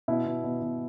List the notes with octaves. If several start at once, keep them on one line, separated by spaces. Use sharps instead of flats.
B2 E4
B2
B2
B2